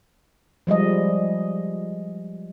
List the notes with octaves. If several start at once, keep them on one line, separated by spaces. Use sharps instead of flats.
F3 G3 G#3 D#5